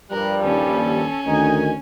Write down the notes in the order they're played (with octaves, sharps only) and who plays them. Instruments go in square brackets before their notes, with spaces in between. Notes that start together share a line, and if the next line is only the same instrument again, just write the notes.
[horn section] G2 F3 G3 [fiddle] A#4 [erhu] F#6
[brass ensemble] D#2 [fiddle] C#4 [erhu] A4
[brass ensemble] D2 D#3 [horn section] D#4 [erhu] G#5